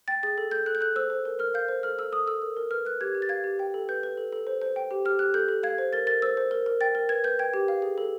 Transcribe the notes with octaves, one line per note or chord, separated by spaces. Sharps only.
G5 A6
G#4 A6
A4
A4 G6
A4 F#6
G6
A4 F#6
C5 E6
C5
A#4
A#4 F6
F5 G6
C5
A4 F6
A4 E6
A4 D#6
A4 E6
A#4
A#4
B4 F6
B4 F#6
G4 G#6
G4
A6
F5 G#6
G4
G5
A4
B4 G6
B4
A4
A4
C5
C5
G5
G4
G4 F6
G4 F#6
A4 G6
A4
F5 G#6
C5
A#4 A6
A#4 A6
C5 E6
C5
A#4
A#4
G5 A6
A#4
B4 G#6
B4 G6
G5 G#6
G4
F5
G#4
A4